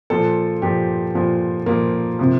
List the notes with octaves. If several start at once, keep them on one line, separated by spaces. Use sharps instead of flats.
A#2 F3 A4
A#2 F3 G4
A#2 F3
A#2 F3 A#3
C3 F3